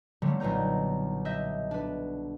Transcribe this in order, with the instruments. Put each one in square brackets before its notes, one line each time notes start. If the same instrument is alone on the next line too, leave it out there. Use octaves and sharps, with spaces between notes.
[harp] D3 F#3 G3 A3 A#3
B1 A#2 B4 A#5 G6
D#5 E5 G6
D4 B4